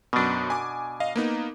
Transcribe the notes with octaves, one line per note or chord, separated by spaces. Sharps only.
F#2 B2 B3 D4
G#5 D6
D#5 F5
A#3 B3 D#4